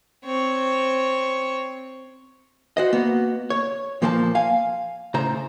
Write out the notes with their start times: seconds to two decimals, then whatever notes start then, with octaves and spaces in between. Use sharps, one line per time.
0.25 C4 C#5
2.77 F#4 C5 D#5
2.93 A#3 B3 F#4
3.50 C#5
4.02 A#2 F3 A#3 C5 C#5 A5
4.35 F5 G#5
5.14 A2 C#3 C5 A#5